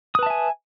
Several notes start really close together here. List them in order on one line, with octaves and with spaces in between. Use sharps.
D#6 B4 A5 E5 G#5